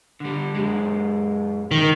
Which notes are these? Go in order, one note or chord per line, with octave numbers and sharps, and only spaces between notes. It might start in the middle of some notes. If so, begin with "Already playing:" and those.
D3 G3
F#2 G#3
D#3